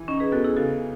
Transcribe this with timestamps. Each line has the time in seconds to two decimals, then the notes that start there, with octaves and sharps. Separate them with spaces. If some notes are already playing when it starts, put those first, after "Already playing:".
Already playing: E3
0.08 C#4 D#4
0.20 G#4 B4
0.32 E2 F#4 A4
0.44 E4 G#4
0.56 C#3 F#4 A4